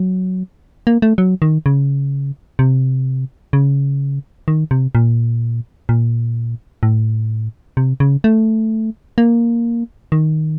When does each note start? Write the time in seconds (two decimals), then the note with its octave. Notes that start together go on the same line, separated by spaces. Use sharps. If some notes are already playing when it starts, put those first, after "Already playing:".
Already playing: F#3
0.87 A#3
1.02 A3
1.18 F#3
1.42 D#3
1.66 C#3
2.59 C3
3.53 C#3
4.48 D#3
4.71 C3
4.95 A#2
5.89 A#2
6.83 A2
7.77 C3
8.00 C#3
8.24 A3
9.18 A#3
10.12 D#3